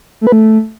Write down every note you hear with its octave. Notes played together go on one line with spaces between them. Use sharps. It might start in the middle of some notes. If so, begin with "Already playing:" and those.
A3
B4
A3